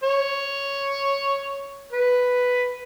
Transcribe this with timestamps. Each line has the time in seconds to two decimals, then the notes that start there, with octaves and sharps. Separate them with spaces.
0.03 C#5
1.92 B4